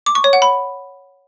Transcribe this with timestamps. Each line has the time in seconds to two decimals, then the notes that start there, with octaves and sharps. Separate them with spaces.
0.06 D6
0.15 C#6
0.24 C#5
0.33 F#5
0.42 B5